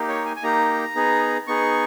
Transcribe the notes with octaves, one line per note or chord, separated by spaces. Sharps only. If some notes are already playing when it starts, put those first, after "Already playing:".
Already playing: A#3 D#4 G4
C#5
G#5
G#5
A#3 D#4 G4 A#5
B3 D#4 G#4
B3 D#4 G#4 C#6